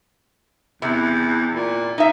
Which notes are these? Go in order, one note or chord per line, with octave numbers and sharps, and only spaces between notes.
E2 C3
A#2
D#4 E5